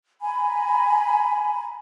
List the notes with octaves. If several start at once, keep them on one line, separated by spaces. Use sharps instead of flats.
G#5 A#5 B5